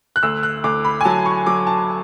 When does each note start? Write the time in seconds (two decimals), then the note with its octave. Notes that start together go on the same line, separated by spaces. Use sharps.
0.16 F#6
0.23 D2 E6
0.43 F#6
0.64 D2 D6
0.85 B5
1.01 G#5
1.05 F#3 A5
1.26 C#6
1.46 F#3 D6
1.67 A5